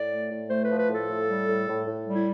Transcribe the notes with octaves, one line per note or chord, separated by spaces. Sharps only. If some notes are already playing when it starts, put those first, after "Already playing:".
Already playing: A2 D5
A3
A2
A3 C5
F3 B4
B4
A2
A4
A2
G3
A2
A2
A2
G3
E4